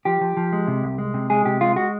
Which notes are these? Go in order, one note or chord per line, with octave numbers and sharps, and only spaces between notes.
F3 G4
F3
F3
G#3
C3
C2
G#3
C3
G#3 G#4
C3 G4
G#3 F4
G#3 F#4